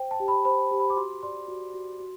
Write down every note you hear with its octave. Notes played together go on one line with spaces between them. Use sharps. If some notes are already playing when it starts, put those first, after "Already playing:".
Already playing: C5 G5
A5
G4
B5
C5 B5
G4
B5
D6
F#4 C6
D5 C6
F#4
F#4
F#4